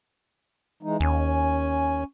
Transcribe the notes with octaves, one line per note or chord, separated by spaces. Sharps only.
E3 G#3 D#4
D#2 C#4 G#5